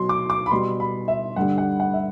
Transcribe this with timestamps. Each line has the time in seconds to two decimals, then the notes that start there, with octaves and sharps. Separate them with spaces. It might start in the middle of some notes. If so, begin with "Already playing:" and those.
Already playing: B2 F#3 C6
0.09 D6
0.30 D6
0.46 B5
0.51 B2 G3 C6
0.80 B5
1.08 E5
1.36 G2 D3 G3 F#5
1.58 F#5
1.80 F#5
1.94 E5